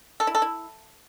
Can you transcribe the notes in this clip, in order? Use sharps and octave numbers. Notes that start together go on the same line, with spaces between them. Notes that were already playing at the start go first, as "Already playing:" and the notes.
A4
E4
A4
E4